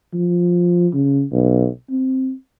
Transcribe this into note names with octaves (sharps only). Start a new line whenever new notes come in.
F3
C#3
B1
C4